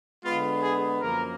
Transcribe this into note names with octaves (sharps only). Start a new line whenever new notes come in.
D3 G#3 B3 F4
G#4
F#2 F3 A#3 A#4